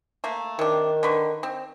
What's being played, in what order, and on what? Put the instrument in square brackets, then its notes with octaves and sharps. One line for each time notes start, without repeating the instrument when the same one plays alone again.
[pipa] A3 A#3
[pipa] C3 D4 [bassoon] D#3
[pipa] D3 B4 C#6
C4